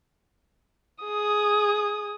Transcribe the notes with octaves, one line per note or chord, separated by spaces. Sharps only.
G#4 D#6